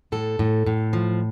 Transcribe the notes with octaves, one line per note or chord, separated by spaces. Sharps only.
A2 A4
A2
A2
F3